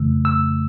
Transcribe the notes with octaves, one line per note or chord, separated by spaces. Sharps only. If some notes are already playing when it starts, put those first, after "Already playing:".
Already playing: F2 C#3 E3 A3 E6
E6